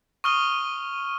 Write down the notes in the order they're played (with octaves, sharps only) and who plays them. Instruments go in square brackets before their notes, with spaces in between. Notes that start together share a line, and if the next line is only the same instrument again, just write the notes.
[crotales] C#6 D#6 F6 D#7 G7